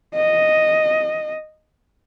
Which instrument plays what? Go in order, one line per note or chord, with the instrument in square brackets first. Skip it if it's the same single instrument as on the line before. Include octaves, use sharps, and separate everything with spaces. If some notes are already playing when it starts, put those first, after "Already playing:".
[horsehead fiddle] D#5